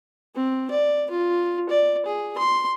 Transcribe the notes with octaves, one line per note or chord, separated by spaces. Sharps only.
C4
D5
F4
D5
G#4
C6